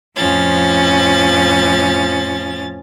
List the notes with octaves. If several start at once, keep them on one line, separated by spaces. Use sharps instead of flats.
F2 A2 F3 C#4 A6